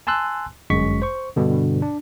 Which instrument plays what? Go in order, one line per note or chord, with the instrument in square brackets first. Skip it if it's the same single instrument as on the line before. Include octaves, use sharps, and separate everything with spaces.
[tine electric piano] G#5 A5 C6 E6 F#6
G1 F#2 G#3 C#6 B6
C5 C#6
G2 B2 D3
D4